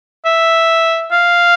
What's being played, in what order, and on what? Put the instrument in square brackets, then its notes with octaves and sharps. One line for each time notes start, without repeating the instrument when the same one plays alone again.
[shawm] E5
F5